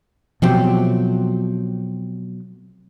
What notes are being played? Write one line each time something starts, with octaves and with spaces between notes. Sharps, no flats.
B2 F3 F#3 A3 C4 G4